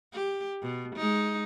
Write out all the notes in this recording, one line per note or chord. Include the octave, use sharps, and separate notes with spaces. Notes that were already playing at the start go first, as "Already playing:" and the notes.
G4
B2
G#3 D#4